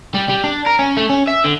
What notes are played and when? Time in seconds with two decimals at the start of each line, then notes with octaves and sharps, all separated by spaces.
0.15 G3
0.29 G3
0.44 D4
0.66 A#4
0.79 C#4
0.97 A3
1.10 C#4
1.27 E5
1.44 D3